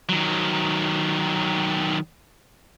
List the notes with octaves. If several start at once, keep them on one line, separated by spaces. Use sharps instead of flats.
D#3 F#3